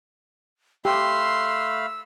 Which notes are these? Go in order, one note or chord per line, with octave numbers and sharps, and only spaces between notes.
A3 G4 F5 B5 C6 E6